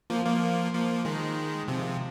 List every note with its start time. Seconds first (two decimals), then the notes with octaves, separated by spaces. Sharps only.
0.10 F3 A#3
0.26 F3 A#3
0.73 F3 A#3
1.05 D#3 G#3
1.68 C3 F3